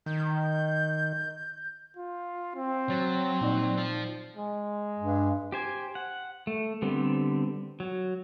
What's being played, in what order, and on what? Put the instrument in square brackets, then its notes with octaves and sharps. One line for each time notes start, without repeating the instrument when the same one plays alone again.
[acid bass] D#3 [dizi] G6
[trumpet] F4
C4
[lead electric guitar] F#3 [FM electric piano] C#5 A6
[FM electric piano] A#2 D#4 D5
[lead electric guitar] F4 C5
[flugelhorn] G#3
[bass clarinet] G2
[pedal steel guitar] G4 C5 G#5
F#5
A3
D3 G3 B3 C4
F#3